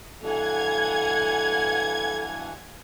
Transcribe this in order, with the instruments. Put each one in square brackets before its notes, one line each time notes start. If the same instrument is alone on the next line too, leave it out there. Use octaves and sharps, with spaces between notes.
[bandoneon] G2 B2 E3 [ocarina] A4 [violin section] F5 F#5 G#5 [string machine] G#6